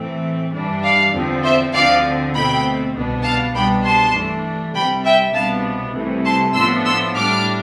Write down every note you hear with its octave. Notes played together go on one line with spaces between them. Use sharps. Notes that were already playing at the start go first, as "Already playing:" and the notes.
Already playing: A2 E3 A3 C4
G2 E3 G3 D4
D5 F5
E2 D3 F3 C4
C5 E5
D2 D3 F3 C4 D5 F5
B2 A3 C4 G5 B5
C2 B2 B3 D4
F5 A5
C2 B2 G3 B3 D4 G5 B5
A5 C6
G2 E3 A3 D4
C2 C3 G3 G5 B5
E5 G5
C2 B2 B3 D4 F5 A5
C2 C3 E3 A3
A5 C6
A2 F3 B3 D4 C6 E6
C6 E6
A2 G3 D4 D6 F6